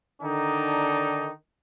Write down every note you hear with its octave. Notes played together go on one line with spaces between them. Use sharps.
D3 D#3 D4 D#4